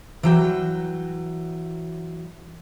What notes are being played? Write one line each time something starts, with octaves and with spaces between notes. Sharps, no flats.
E3 F#3 G5